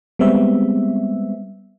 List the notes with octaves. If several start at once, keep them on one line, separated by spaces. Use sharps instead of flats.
G3 G#3 B3 C4 E5